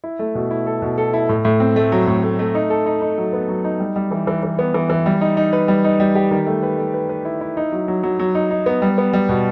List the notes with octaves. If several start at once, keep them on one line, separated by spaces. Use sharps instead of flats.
E4
A3
B2
E4
A4
B2
A4
E4
A2
A2
C4
A3
F#3
A2
A3
A3
D#4
A4
D#4
D#4
F#3
B3
F#3
D#4
G3
G3
E3
E3
E3
B3
E3
E3
G3
D#4
D#4
B4
G3
D#4
G3
G4
D#3
A3
B4
A3
B4
B4
E4
E4
D#4
F#3
F#3
F#3
F#3
D#4
D#4
B3
G3
B3
G3
B2